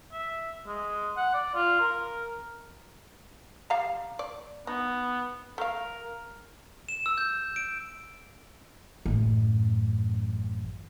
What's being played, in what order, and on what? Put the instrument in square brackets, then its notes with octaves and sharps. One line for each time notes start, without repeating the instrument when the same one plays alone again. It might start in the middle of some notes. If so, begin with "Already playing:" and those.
[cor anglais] E5
G#3
F#5
D5
F4
A#4
[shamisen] G3 F5 A#5
D5
[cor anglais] B3 [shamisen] D#4
[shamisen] A3 F5 [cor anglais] A#4
[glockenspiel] E7
E6
G6
D7
[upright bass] A1 F#2